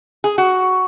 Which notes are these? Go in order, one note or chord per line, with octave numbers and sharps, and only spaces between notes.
G#4
F#4